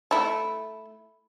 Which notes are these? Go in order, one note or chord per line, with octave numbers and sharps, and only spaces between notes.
A3 E4